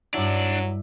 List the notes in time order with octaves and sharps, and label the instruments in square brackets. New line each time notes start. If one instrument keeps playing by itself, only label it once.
[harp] G2 E4 [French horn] F#3 [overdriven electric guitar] D4